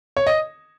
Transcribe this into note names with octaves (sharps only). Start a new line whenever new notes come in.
C#5
D#5